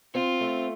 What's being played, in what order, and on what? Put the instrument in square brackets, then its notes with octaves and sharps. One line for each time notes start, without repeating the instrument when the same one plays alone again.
[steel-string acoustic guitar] C4 [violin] F4
[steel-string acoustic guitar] A3